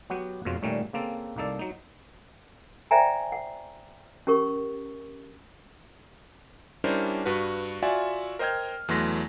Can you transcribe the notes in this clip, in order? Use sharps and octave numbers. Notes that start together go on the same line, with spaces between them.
F#3 B3 F#4 G4
F2 B2 G#3 C#4 F4
A#2 D#3 G3 A3 C#4 D#4
C#3 A#3 C4 A4
C2 A#3 D#4 A4 D5
F#3 D#4
C5 D5 E5 G5 G#5 A#5
F#5
C#4 G4 A#4 C#6
G3 C#4 D4 E4 A#4 C5
G2 F#4 B4
F4 F#4 D5 E5 F#5 G#5
A#4 C5 D#5 G5 F6 G#6
E2 E3 F#3 A3 C6 A#6